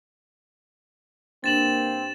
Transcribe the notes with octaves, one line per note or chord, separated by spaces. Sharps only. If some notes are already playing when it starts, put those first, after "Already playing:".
G2 A#3 C4 A6 E7 F#7